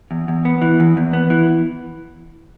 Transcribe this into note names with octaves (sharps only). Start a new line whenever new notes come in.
E2
E2
B3
E3
E2
E2
B3
E3